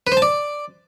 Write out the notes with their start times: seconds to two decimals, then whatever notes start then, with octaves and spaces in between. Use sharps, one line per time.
0.07 B4
0.12 C5
0.17 A5
0.22 D5